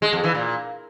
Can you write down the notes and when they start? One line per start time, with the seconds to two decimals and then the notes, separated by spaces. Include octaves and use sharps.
0.02 G#3
0.13 F2
0.24 E3
0.35 A#2